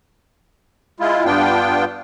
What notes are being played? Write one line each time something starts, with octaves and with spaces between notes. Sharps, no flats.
G#3 E4 F4
G2 B3 D4 F4 G5